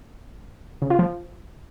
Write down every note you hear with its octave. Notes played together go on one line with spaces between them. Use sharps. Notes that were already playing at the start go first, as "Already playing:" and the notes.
C#3
F4
F3